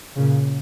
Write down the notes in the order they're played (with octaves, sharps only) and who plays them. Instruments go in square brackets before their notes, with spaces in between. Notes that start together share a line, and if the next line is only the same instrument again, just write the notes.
[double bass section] A#2 C#3